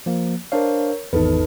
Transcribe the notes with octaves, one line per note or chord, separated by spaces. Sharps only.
F3 A#3
D4 A#4 C5 C#5 F5
G#1 E2 D#4 A4 B4